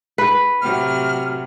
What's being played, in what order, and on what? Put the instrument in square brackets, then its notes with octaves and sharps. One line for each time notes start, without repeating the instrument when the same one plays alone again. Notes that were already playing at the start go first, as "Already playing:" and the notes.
[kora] B4
[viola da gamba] A2 C3 F#3 [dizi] F6